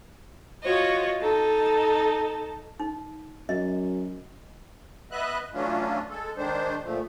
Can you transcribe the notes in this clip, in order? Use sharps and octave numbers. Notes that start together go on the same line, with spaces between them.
F4 F#4 C#5 D#5
D#4 A4 A5
D#4
F#2 D#5
B3 B4 D#5 E5 F#6
E3 F#3 A3 C#4 D4 F4
G#3 A4
D#3 G#3 D4 C5
A#2 F3 A3